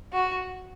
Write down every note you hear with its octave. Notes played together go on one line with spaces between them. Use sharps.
F#4